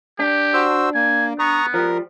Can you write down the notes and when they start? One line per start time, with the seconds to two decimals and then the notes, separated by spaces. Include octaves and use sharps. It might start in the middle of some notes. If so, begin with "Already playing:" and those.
0.20 D4 G4
0.54 F#4 C5 E6
0.95 A#3 G#5
1.39 B3 A#5 C#6 D#6
1.74 F3 G3 A#4